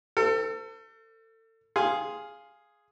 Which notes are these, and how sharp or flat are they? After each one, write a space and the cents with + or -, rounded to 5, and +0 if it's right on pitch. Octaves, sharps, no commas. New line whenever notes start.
A4 +35 C5 -35 E6 +0
G#4 +0 F5 +0 C6 +0